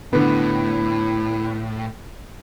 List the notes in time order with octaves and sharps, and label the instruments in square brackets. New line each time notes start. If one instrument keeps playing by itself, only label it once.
[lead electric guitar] A2 [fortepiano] D3 B3 [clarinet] E4